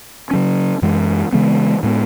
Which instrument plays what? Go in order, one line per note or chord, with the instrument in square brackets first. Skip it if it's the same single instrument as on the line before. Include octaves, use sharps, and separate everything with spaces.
[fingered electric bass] C#3 F#3 C#4
F#2 E3 G#3
C#3 E3 G#3 B3
A2 G#3 B3